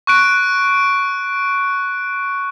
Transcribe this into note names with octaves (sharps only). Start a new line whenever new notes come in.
C#6 F#6 D7